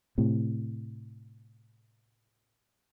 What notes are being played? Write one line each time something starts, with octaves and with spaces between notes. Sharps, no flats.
A2 C3